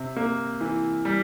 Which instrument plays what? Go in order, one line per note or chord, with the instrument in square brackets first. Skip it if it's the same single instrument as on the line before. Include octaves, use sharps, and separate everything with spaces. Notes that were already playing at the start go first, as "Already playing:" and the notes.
Already playing: [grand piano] C3
A#3
E3
G3